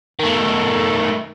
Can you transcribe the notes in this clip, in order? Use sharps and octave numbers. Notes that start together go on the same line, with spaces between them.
D#3 A3